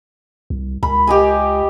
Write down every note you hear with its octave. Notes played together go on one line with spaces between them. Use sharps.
C2
C#2 B5
G4 D#5 G#5